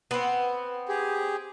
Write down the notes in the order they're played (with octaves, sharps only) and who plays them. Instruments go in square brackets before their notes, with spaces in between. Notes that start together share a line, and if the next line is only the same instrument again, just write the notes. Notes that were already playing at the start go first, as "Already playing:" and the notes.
[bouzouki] B3 C4
[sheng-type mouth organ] G4 G#4